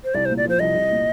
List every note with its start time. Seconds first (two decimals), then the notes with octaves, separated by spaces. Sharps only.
0.04 C5
0.14 C2 D5
0.25 C5
0.30 A#2
0.37 D5
0.45 F3 C5
0.60 C2 D#5
0.75 C2
0.91 A#2